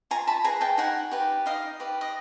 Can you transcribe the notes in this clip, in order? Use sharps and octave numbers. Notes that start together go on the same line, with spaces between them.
F4 G#5 A#5
A5 B5
G#4 B4 G#5 A#5
G5 A5
D#4 F#5 G#5
G4 B4 D5
D#4 D#5 F5
G4 B4 D5
D#5